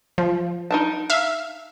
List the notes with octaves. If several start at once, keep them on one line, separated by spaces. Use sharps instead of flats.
F3
D#4 A#4 A5
E5 F5